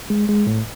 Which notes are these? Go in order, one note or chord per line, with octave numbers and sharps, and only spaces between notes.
G#3
G#3
A2